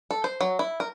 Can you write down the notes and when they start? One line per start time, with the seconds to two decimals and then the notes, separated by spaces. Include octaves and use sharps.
0.11 A4
0.24 C5
0.41 F#3
0.59 E4
0.80 A#4